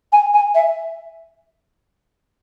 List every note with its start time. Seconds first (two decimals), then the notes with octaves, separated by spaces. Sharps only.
0.12 G#5
0.34 G#5
0.55 E5